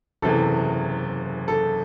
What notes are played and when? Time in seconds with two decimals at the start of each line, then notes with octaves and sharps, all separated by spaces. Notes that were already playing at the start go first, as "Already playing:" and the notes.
0.22 F#1 E2 C3 E3 A4
1.48 A4